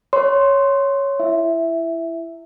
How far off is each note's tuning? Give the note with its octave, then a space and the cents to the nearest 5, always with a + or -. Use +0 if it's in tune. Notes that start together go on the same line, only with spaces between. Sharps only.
C#5 +0 C6 +0
E4 +20 E5 +0